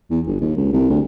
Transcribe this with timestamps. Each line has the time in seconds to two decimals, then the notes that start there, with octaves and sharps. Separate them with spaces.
0.10 E2
0.27 G1
0.41 D#2
0.57 C#2
0.73 C2
0.90 D2